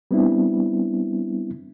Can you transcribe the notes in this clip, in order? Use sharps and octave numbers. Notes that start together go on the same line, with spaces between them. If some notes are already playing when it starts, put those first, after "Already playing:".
G3 B3 C4 D4 E4